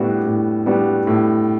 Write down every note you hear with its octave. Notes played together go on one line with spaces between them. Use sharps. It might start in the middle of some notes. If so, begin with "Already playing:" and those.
Already playing: A2 G3 B3 D4 F#4
A2
G3 B3 D4 F#4
A2